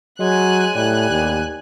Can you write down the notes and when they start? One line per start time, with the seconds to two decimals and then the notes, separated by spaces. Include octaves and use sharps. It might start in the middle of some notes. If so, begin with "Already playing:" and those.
0.19 F#3 G#3 G#5 F#6
0.76 A2 G3 G#5 F#6
1.10 D#2